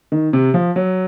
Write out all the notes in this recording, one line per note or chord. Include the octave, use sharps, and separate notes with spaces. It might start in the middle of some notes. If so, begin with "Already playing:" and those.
D#3
C3
F3
F#3